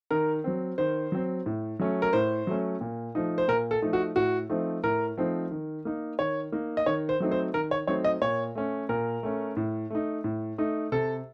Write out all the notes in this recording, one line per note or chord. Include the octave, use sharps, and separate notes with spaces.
D#3 A#4
F#3 C4
D#3 C5
F#3 C4
A2
F#3 A3 C#4
A#4
A2 C5
F#3 A3 C#4
A#2
F3 A3 D#4
C5
A#2 A#4
A4
F3 A3 D#4
F#4
A2 F#4
F3 A3 C4 D#4
A2 A#4
F3 A3 C4 D#4
D#3
A#3 D#4
D#3 C#5
A#3 D#4
D#5
D#3 C#5
C5
F#3 A3 C4 D#4
C5
D#3 A#4
C#5
F#3 A3 C4 D#4 C#5
D#5
A#2 C#5
A3 C#4
A#2 A#4
A3 C#4
A2
A3 D#4
A2
A3 D#4
C3 A4